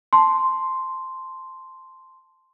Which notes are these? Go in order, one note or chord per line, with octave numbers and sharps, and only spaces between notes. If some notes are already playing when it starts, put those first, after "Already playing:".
A5 C6